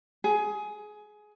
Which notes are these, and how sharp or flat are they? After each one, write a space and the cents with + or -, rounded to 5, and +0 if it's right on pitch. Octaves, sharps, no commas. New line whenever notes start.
G#4 +20